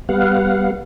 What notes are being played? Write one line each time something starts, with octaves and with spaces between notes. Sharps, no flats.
G3 B3 F5 F#5